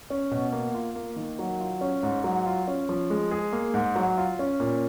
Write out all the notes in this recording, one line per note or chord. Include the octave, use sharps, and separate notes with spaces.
C#4
B2
A#3
F4
A#3
D#3
F#3
F4
C#4
G#2
F#3
F4
C#4
F3
G#3
G#4
A#3
G#2
F#3
F4
C#4
A#2